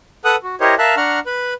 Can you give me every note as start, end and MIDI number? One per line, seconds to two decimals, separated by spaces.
0.25 0.36 69
0.25 0.36 71
0.25 0.36 78
0.25 0.36 87
0.25 0.36 90
0.43 0.55 66
0.61 0.75 64
0.61 0.75 67
0.61 0.75 70
0.61 0.75 72
0.61 0.75 73
0.61 0.75 75
0.79 0.95 70
0.79 0.95 76
0.79 0.95 77
0.79 0.95 81
0.79 0.95 90
0.97 1.20 62
0.97 1.20 78
0.97 1.20 82
0.97 1.20 85
0.97 1.20 89
1.26 1.54 71
1.26 1.54 83